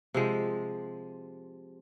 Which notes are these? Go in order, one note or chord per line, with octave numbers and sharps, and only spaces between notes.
C3 F3 G#3